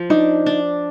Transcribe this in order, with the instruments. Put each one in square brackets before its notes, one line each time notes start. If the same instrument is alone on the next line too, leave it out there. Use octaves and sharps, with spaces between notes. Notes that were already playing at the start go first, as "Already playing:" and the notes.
Already playing: [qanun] F3
[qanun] D4 [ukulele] D#4
[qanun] D4